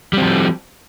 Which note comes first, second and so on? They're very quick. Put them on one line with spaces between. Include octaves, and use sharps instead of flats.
G3 C4 F3